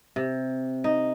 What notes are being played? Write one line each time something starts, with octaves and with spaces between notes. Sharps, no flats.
C3
D#4